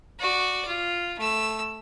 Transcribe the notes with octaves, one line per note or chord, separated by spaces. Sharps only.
F#4 D5
F4
A3 E6